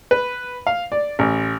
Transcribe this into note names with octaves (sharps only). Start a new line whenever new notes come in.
B4
F5
D5
A1